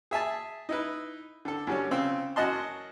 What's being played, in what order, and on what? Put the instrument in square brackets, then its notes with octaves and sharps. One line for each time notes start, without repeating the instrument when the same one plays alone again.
[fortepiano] G#4 E5 G#5 A5
D#4 E4 B4
D3 A4
F#2 D3 G3 C#4
C#3 C4 F4 E6
F#2 F#4 D#5 A5 C6